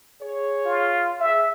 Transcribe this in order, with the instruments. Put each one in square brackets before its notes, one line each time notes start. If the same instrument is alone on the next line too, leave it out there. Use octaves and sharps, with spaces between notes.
[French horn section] G#4 C#5
[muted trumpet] F4
[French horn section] G#4 [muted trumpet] E5